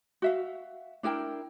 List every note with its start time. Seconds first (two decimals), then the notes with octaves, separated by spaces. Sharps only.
0.22 F#4 E5 F5
1.03 D4 E4 A#4 G5